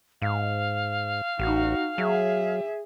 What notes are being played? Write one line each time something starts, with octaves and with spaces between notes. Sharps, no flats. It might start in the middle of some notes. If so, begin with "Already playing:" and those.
G#2 F5
A1 D#4 F#4
F#3 G#4 E5